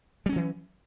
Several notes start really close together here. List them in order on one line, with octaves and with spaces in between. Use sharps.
G3 C#4 F#3 E3